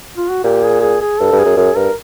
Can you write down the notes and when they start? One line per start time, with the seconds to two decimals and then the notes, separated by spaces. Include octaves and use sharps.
0.17 F4
0.30 F#4
0.44 A#2 G4
0.63 G#4
0.81 G#4
1.01 G#4
1.19 G2 A4
1.32 G2
1.39 G#4
1.45 F#2
1.57 F#2 G#4
1.76 G2 A#4